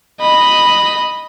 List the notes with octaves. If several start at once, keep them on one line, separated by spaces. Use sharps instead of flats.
D#5 B5